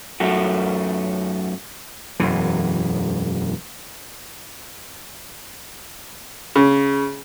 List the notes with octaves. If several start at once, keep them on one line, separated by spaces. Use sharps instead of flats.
F#2 A3 F#4
E1 F#2 E3
C#3